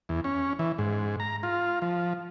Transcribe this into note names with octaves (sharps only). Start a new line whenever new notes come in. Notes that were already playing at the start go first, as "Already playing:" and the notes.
E2
C#4
E3
G#2
A#5
F4
F3